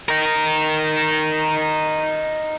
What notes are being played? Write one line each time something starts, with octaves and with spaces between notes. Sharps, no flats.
D#4 A#4